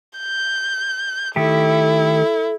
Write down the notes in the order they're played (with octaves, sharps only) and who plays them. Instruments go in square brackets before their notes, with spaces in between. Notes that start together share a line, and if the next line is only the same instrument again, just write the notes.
[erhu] G6
[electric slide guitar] D#3 A3 G4 [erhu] E4 [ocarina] A4